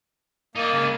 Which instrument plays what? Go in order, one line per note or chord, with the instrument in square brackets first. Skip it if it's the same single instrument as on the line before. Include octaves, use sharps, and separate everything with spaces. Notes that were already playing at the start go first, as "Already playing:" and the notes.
[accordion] A#3 [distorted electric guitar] D#4 D5
[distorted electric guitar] C#3 G#3